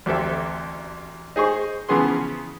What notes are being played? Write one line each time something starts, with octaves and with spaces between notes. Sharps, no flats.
A1 D2 C4 G4 A4 E5
D#4 G#4 C5 C#6
C#3 E3 F3 B3 G#4 C6